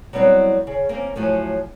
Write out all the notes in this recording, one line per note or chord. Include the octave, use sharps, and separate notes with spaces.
F#3 G3 B3 C4 E4 F#4
C#3
A#3 C4 C#4
A2 F3 F#3 A3 G#5